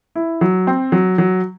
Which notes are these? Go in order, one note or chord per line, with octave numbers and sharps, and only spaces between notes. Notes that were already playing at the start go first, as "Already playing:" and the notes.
E4
F#3
C4
F#3
F#3